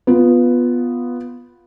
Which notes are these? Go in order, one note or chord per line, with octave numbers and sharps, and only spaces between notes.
B3 F4